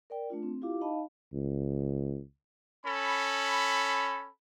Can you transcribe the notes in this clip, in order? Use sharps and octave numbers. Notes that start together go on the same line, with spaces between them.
A#4 D5 G5
A3 D4 F4
C4
E4 F4 G4 F5 D6
D#4 D#5 F5 A5 B5
C#2
C#4 A4 B5